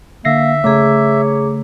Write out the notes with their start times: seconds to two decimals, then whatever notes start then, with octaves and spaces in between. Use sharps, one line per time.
0.25 D3 A#3 E5 A#6 C7
0.64 C#3 A3 G#4 C#5 A#5 D6